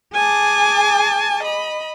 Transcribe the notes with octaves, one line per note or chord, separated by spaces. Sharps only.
G#4 G#5 A5 D6
D#5 B5